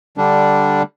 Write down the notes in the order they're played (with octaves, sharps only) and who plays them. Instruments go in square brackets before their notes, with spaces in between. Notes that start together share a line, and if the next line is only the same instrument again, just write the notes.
[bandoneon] D3 G3 D4